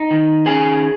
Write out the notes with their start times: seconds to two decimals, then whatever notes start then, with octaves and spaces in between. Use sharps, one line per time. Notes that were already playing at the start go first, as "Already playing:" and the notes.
Already playing: D#4
0.11 D#3
0.46 C#4 G#4 G#5